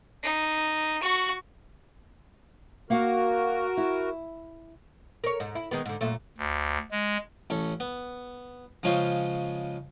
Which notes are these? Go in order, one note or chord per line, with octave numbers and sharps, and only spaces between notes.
D#4
F#4 C#6
A#3 F#4 A#4 F5 F#5
E4
A#4 C#5
G#2
E4
D#3 G#3 B3
G#2 D3
F#2 A#2 A3
D2
G#3
A1 C#4 A4
B3
C#3 F3 G#3 C#4 F4 C5